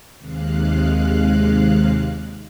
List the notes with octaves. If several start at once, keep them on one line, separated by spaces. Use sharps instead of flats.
D#2 C3 G#3 F5 F#6